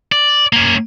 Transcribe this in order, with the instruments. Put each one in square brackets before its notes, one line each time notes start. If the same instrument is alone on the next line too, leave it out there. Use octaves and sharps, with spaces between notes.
[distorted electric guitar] D5
A#3 C#4